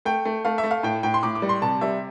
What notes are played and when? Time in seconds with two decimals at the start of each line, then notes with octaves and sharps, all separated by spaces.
0.05 A3 G5
0.25 A3
0.45 A3 F5
0.58 E5
0.64 A3
0.71 F5
0.83 A2 G5
1.03 A2 G5
1.14 C6
1.23 A2 D6
1.35 D6
1.42 G3
1.49 C6
1.62 C3 A5
1.81 G3 E5